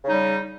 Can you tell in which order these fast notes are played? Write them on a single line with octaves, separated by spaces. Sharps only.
C#3 D#4 G3